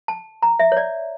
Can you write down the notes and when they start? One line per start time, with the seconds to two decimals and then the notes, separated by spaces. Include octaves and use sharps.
0.08 A5
0.43 A#5
0.59 E5
0.72 C#5
0.77 D5